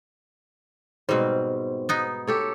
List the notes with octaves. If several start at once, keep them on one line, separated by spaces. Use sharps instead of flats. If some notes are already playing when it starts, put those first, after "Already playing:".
G#2 B2 G3 C4 C5
B3 D#4
G4 A4 C#5